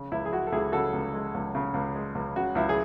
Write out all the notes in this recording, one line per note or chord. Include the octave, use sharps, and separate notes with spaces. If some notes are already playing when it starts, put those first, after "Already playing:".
Already playing: C#3
C#2 E4
G#4
G#3 F#4
A4
C#2 E4 G#4
C#3 F#4 A4
C#2
G#3
C#2
C#3
C#2
G#3
C#2
C#3 F#4
C#2 E4
G#4